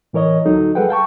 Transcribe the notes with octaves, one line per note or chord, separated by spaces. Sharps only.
A2 E3 A#4 C#5 D#5
D2 F#3 D#4 A4
G3 G#4 A4 B4 F#5 G5
F5 G5 A5 C#6